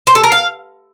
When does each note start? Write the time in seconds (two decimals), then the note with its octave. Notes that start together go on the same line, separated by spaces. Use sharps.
0.07 C5
0.15 A4
0.23 A#4
0.32 F5